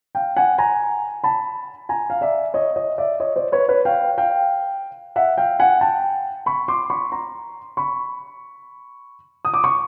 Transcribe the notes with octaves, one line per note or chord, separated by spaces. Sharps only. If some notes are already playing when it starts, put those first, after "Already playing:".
F5 G5
F#5 G#5
G#5 A#5
A5 B5
G#5 A#5
F5
D5 E5
C#5 D#5
C#5 D#5
D5 E5
C#5 D#5
C5 D5
B4 C#5
B4 C#5
F5 G5
F5 G5
E5 F#5
F5 G5
F#5 G#5
G5 A5
B5 C#6
C6 D6
B5 C#6
A#5 C6
B5 C#6
D#6
D6
C#6